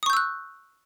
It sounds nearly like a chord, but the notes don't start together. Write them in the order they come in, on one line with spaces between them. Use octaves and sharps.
D#6 C#6 G6 E6 F#6